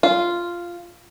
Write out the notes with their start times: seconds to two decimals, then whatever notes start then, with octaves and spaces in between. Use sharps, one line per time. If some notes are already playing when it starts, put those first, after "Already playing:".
0.03 F4